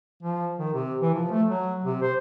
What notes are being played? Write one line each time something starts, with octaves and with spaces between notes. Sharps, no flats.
F3
D#3
C3
E3
F3
A3
F#3
C3
C5